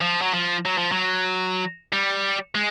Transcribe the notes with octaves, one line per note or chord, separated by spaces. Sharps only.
F3
F#3
F3
F#3
F3
F#3
G3
G#3